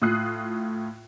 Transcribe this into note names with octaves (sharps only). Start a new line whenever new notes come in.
A2 F4 D#6 F#6 C7